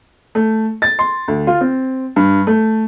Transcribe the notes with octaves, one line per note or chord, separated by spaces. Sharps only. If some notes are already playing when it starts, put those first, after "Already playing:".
A3
A6
C6
D2
F4
C4
G2
A3